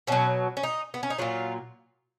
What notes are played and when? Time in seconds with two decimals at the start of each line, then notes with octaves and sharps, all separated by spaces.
0.07 B2 F#3 C#4
0.57 C#4
0.63 D#4
0.94 B3
1.03 C#4
1.10 D#4
1.18 A#2 F#3 F4